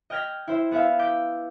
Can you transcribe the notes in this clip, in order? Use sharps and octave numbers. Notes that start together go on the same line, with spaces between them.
D#5 G5 F6 G#6 A#6 B6
E4 C5 E5
B3 G#4 B4 E5 F5
D6 G6 B6